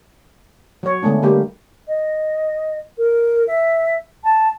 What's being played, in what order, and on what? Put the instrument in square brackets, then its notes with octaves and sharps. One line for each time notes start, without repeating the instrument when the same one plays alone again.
[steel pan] F#3 C#5
D3 G#3 A3 B3 D4
D3 G3 A#3 G4
[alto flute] D#5
A#4
E5
A5